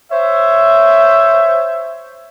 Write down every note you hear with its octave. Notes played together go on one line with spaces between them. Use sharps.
C5 C#5 E5